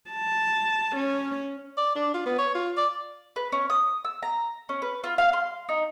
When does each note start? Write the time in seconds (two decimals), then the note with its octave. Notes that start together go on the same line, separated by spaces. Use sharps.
0.11 A5
0.96 C#4
1.77 D5
1.96 D4
2.14 F4
2.26 B3
2.38 C#5
2.54 F4
2.77 D5
3.36 B4
3.52 C#4
3.70 D#6
4.05 E6
4.22 A#5
4.69 C#4
4.82 B4
5.04 F4
5.18 F5
5.33 C6
5.69 D#4